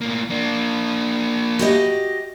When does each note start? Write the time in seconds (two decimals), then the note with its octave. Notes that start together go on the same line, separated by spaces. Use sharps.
0.01 A2 A#3
0.30 A#3 D4
1.59 F#4 G4 D#5